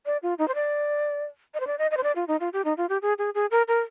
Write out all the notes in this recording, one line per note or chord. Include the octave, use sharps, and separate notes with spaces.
D5
F4
D#4
C5
D5
D#5
C5
D5
D#5
D#5
C5
D5
F4
D#4
F4
G4
D#4
F4
G4
G#4
G#4
G#4
A#4
A#4